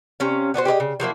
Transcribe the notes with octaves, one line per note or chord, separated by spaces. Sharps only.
C3 C#4 F5
B3 D4 F#4 C5
G4 G#4 B4 D#5
C#3
F3 F#3 A#3 E4